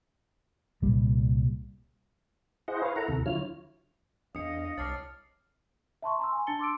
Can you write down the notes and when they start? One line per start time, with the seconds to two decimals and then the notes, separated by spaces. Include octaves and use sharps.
0.82 C2 A#2 G3
2.68 E4 G#4 C5 D#5 F#5
2.82 B4 C#5 F5
2.96 E4 A4 A#4 F#5 A#5
3.08 D#2 C3 A4
3.26 D3 F#3 E4 F4 C#5 F6
4.35 E2 D4 D#5 F5 D#6 C#7
4.78 C2 C#5 A5 D6 F6 A6 C7
6.02 E5 A5 C6 C#6
6.19 A#5 C6 E6
6.32 G#5
6.47 D4 A5 A6 C#7 G7
6.59 C6 D6 E6 D7